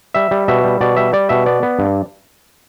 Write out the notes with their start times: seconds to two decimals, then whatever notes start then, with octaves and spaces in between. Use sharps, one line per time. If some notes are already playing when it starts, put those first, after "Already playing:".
0.14 G3 E5
0.31 G3
0.48 B2 E5
0.64 G3
0.81 B2 D5
0.96 G3 E5
1.13 G3 D5
1.29 B2 E5
1.46 B3 D5
1.63 B3
1.79 G2